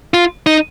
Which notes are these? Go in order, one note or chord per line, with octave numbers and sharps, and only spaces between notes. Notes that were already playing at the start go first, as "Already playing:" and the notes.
F4
D#4